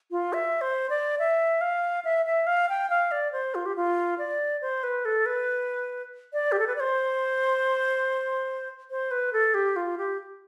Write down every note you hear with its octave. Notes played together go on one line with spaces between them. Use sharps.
F4
E5
C5
D5
E5
F5
E5
E5
F5
G5
F5
D5
C5
F4
G4
F4
D5
C5
B4
A4
B4
D5
G4
A4
B4
D5
C5
C5
B4
A4
G4
F4
G4